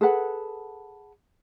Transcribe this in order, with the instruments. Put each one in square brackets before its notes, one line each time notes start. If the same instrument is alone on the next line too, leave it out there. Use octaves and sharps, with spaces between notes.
[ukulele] G#4 A4 B4 F#5